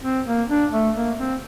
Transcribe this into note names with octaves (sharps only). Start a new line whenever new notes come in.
C4
A#3
D4
A3
A#3
C4